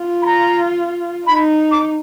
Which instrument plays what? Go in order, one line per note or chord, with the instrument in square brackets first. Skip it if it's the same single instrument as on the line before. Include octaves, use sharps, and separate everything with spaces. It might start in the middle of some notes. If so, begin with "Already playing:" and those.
Already playing: [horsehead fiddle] F4
[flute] B5
A#5
[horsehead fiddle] D#4 [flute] B5
[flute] D6